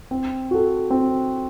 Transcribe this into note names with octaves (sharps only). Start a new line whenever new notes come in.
C4
F#4 A4
C4